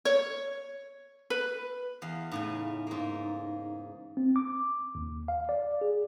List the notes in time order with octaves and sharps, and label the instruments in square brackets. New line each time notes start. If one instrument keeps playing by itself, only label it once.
[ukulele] C#5
B4
[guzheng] E2 F5
[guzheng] A2 C#3 G#5 [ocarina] D#4
[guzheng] G#2 A#3
[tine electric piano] C4
D6
D#2
F5
D5
G#4